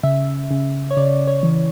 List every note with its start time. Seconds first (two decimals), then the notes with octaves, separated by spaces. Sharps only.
0.03 C#3 E5
0.51 C#3
0.91 C#5
0.97 C#3 D5
1.27 C#5
1.43 E3